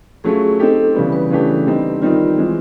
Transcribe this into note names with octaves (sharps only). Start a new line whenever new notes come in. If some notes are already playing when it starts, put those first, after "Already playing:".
F#3 A3 C#4 F4 G#4
C4 D#4 G4 A4
C#3 E3 G3 B3
B4
C#3 E3 A3 D4 G4
D3 G3 C4 D#4
D#3 G3 C4 D#4 F4
E3 G#3 C4